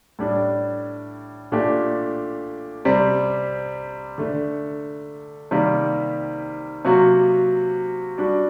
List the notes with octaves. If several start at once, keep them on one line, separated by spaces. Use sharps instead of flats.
A2 G3 D4
A#2 A3 D4 G4
C3 G3 C4
D3 A3 D4
C3 D#3 G3 A#3
C3 F#3 A#3 F#4
G3 D4 F#4